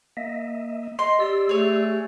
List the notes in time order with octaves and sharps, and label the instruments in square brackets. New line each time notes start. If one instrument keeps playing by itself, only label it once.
[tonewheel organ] A#3 D#5 E5
[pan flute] D#5 [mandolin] C6
[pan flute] G4 [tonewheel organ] D5 E6
[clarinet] A3 [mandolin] G#4 C#5